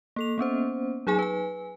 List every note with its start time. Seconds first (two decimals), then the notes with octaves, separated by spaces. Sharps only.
0.16 A#3 A4 F7
0.38 A#3 B3 C#4 C5
1.07 F#3 D#4 G#4 G#5
1.19 B4 G#5